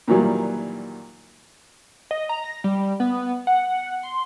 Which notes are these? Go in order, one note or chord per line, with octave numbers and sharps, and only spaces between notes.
A#2 D#3 E3 F#3 G3
D#5
A#5
A#6
G3
B3
F#5
C6